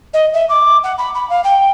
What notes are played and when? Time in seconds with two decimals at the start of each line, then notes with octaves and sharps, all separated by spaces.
0.14 D#5
0.34 E5
0.49 D6
0.84 F#5
0.98 B5
1.15 B5
1.30 F5
1.44 G5